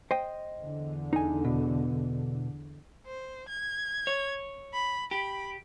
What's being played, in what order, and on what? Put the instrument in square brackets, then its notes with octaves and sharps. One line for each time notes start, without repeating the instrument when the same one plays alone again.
[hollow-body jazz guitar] C5 D#5 G5
[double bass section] E2 D3
[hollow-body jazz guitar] D#4 G#5
B2
[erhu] C5
G#6
[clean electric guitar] C#5
[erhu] B5
[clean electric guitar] G4 [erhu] B5